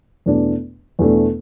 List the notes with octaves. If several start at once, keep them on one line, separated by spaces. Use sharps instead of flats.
E2 B2 A3 D4
E2 B2 A3 D4